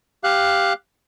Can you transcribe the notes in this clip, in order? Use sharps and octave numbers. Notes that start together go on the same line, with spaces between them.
G4 F5 F#6